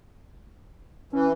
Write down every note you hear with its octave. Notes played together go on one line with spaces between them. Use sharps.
E3 C#4